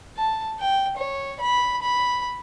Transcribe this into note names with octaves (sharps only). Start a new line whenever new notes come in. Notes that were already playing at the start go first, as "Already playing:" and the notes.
A5
G5
C#5
B5
B5